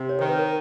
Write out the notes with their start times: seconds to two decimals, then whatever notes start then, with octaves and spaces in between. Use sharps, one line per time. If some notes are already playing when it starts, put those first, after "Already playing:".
Already playing: C3
0.09 C#5
0.19 D#3 C5
0.29 B4
0.39 A#4